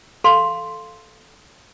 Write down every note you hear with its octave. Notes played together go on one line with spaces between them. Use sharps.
A4 F5 C6